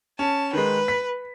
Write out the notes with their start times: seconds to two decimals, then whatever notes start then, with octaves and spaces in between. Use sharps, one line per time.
0.19 C#4 A5
0.53 D#3 G#3 B4
0.88 B6